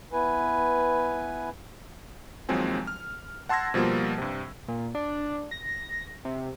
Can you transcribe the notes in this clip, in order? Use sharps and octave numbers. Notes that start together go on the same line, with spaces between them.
B3 E4 B4 G#5
D#2 F3 F#3 G#3 C4 G#5
F6
F#5 A5 C6 E6 G#6 A#6
B2 F3 G3 A#3 F4
G2 C3
A#2
D4
A#6
C3